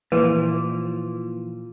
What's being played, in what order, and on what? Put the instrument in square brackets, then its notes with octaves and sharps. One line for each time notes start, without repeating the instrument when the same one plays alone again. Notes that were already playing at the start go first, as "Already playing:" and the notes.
[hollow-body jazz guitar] A#2 [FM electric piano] E3 F3 [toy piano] B4